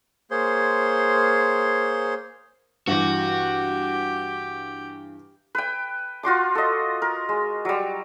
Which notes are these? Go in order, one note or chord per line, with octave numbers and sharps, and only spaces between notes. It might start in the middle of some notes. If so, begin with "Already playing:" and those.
A#3 G#4 C5 C#5 C6
G2 E3 F#4 G4
B4 G5
F4 F#4 C6 D6
A4 D#5
A#4
G#3
F#3 G3